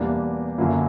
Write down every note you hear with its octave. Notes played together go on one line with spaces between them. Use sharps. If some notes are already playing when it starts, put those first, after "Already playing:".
Already playing: E2 B2 G3 A#3 D4
F#2 D3 F#3 A#3 E4